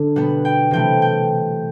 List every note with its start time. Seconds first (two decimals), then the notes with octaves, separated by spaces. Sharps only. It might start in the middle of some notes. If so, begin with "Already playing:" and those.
Already playing: D3
0.16 B2 G3 B3 F#5
0.45 G5
0.71 C3 E3 A3 G5
1.02 G5